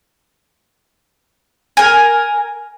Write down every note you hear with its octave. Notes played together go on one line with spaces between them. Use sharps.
A#4 G#5